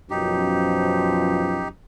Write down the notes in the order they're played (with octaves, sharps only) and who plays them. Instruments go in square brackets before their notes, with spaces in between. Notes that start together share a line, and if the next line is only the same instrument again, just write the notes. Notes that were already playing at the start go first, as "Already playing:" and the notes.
[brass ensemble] F#2 B2 F3 [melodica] D#4 G4